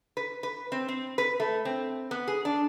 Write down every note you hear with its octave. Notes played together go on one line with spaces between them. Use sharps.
B4
B4
C4
C4
B4
A3
C4
B3
G#4
D4